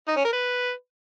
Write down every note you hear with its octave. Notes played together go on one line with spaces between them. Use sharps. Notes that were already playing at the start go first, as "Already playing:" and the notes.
D#4
C#4
A#4
B4